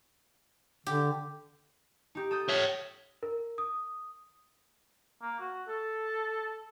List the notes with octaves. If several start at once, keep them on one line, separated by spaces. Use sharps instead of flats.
D3 G4
D#4 G4
A4 D#6 G6
C#5 E5 F6
A#4
D#6
A#3
F#4
A4